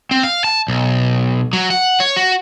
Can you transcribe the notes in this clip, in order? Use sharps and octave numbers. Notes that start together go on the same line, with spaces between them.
C4
F5
A5
B1
F#3
F#5
C#5
F#4